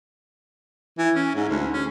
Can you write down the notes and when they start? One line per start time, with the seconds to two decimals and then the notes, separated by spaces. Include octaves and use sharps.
0.98 E3
1.16 C#4
1.35 G#2
1.49 D2
1.74 C#4